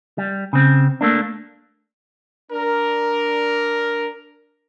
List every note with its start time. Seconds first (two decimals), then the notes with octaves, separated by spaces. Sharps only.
0.18 G3
0.53 C#3 C4
1.01 A3 A#3 D4
2.52 D4 A#4